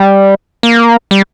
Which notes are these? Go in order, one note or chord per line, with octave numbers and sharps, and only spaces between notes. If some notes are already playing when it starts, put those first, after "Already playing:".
Already playing: G3
A#3
G3